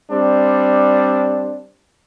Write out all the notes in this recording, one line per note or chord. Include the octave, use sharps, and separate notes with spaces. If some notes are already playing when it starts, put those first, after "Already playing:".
G3 C4 D4